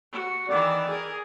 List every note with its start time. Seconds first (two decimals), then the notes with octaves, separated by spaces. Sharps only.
0.12 F#4
0.49 D#3 E3 D5
0.90 G#4 A#4